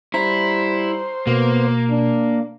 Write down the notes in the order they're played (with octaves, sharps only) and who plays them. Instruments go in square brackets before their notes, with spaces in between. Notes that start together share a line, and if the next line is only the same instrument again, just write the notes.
[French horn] G3 [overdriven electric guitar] E4 [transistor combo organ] C5 [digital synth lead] A#5
[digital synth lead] B2 [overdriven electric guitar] A#3 [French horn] B3
[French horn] D4